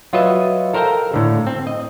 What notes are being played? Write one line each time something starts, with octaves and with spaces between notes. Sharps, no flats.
F#3 F4 F#4 B4 D#5 E5
A4 A#4 C5 F5 G5 A#5
A2 D3
C4
D#5